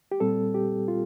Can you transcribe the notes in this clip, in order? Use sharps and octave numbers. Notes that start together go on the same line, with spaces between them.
G4
A#2 G3 C4 A4
G4
F4